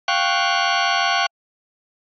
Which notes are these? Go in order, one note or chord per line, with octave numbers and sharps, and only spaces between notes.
F5 G5 C#6 F#6